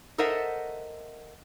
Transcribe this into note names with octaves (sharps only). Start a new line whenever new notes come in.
A4 A#4 C5 D#5 E5 F#5